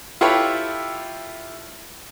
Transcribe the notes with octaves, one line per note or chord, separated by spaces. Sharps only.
E4 F4 G4 A4 B4 C#5